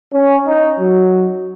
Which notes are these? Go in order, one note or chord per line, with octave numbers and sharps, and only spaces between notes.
C#4
D#4
F#3